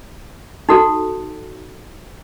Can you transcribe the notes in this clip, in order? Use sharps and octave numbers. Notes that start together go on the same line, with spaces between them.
D#4 F#4 A4